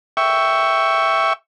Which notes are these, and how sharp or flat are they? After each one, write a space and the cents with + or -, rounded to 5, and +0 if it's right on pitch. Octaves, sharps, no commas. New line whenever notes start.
E5 +0 G5 +0 C#6 +10